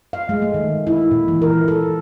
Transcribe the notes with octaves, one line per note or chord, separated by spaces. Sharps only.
F5
G#3
A3
D#3
E4
A#2
E3
A#4
A4